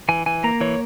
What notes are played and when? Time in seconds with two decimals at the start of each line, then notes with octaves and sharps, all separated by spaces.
0.09 E3 G#5
0.26 E3 G#5
0.44 A#3 A#5
0.61 E3 C#5